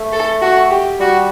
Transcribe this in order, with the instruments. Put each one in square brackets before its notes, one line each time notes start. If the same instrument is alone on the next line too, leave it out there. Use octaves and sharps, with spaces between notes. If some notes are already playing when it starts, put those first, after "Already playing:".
Already playing: [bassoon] A3
[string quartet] A4
F#4
G4
[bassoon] G3 [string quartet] F#4